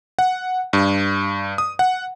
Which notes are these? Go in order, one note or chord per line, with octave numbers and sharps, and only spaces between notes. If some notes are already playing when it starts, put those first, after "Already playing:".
F#5
G2
D#6
F#5